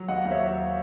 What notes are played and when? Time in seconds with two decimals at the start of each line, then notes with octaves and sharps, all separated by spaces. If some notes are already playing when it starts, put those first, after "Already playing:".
Already playing: F#3
0.08 D#2 D#5 F#5
0.25 D#2
0.31 C#5 E5
0.43 F#3